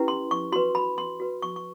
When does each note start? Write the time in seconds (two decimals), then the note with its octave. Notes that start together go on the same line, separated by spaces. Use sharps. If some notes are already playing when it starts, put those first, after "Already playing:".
Already playing: C#4 E4 G4 B4
0.08 C6
0.31 C#6
0.52 F#4 B4 C6
0.75 B5
0.98 C6
1.20 F#4 B4
1.42 C#6
1.56 C#6